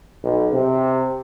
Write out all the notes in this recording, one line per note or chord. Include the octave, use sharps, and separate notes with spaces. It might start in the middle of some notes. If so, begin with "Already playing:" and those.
B1
C3